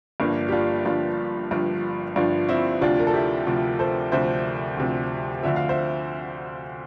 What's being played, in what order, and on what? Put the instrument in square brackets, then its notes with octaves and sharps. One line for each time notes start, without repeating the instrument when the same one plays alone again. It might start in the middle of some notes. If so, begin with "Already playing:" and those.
[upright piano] G1 G2 F3 A#3 D4
G4
D4 F4
G1 G2 F3 D4 F4
G1 G2 F3
G1 G2 F3 D4 F4
C4 E4
D2 C3 F3 D4 F4
A#4
A4
E4 G4
D2 C3 F3
A4 C5
D2 C3 F3 C5 E5
D2 C3 F3
D2 D3 F3 E5
F5
C5 E5